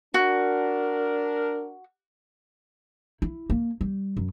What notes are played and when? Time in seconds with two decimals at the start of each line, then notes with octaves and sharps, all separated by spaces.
0.14 D4 F#4 A#4
3.22 E4
3.50 A#3
3.81 G3
4.17 F#2